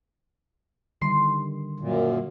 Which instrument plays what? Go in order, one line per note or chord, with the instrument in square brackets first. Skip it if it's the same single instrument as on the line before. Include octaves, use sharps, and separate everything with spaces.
[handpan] D3 D#3 G3 [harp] C6
[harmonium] F#2 A#2